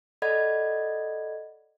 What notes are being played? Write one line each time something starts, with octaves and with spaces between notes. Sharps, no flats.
A4 D5 D#5 F#5 B5 G#6